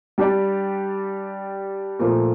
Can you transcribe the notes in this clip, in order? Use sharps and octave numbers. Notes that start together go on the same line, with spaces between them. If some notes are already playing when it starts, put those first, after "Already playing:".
G3 D4 G4 D5
A#2 F3 A3